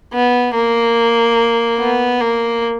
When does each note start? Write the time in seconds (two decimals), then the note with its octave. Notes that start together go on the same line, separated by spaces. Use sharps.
0.13 B3
0.55 A#3
1.80 B3
2.21 A#3